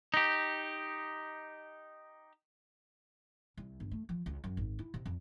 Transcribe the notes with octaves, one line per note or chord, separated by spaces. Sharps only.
D#4 G4
C2
G1
A3
F3
C#2
F#2
G#1
E4
C3
F2